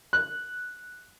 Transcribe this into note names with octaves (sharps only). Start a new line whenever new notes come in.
F#6